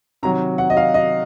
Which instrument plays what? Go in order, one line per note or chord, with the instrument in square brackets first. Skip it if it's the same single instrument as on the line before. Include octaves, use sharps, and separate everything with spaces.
[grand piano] C3 D#3 F#3 [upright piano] A#5
[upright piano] F#5
D#5
F5
D#5